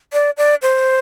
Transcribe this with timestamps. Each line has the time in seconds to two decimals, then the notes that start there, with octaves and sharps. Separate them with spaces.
0.13 D5
0.37 D5
0.62 C5